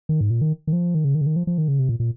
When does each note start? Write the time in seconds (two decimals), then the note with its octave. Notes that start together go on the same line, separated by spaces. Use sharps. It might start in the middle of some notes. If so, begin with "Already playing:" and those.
0.09 D#3
0.21 G#2
0.30 A#2
0.41 D#3
0.67 D#3
0.73 F3
0.95 D#3
1.04 C#3
1.15 D#3
1.21 C#3
1.26 D#3
1.36 F3
1.47 F3
1.58 D#3
1.68 C#3
1.79 C3
1.89 A#2
2.00 A#2